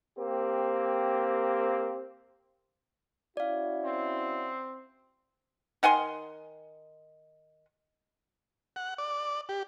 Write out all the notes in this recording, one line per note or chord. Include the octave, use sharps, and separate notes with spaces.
A#3 C4 G4
C#4 E4 F#4 D5 F5
C4
D#3 F#5 G#5 C6
F#5
D5
G4